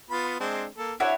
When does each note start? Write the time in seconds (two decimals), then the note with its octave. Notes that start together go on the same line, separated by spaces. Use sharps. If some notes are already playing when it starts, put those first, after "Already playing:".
0.10 B3 F4 B5
0.40 G#3 C4 D4
0.78 A#3 A4
1.00 D4 E4 F#4 C#5